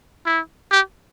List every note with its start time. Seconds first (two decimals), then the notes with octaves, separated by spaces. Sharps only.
0.26 E4
0.71 G4